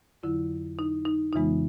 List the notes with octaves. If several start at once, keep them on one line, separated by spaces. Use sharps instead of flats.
F2 D3 F#3 E4
D#4
D#4
F2 C#3 E3 G#3 B3 D#4